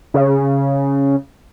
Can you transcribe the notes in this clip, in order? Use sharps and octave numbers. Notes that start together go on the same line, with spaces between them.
C#3